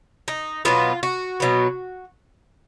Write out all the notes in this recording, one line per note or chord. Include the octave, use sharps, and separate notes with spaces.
D#4
B2 F#3 B3 F4
F#4
B2 F#3 B3